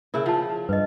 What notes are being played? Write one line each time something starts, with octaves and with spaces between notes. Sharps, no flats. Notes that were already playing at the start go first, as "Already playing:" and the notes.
C#3 E4 A#4 B5
F3 F#5 A5
G2 B4 D#5